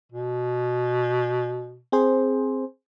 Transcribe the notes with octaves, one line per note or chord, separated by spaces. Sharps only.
B2
C4 G#4 C5